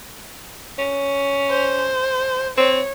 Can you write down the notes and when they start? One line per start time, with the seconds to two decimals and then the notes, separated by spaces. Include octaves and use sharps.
0.79 C#4
1.50 C5
2.58 C4 C#5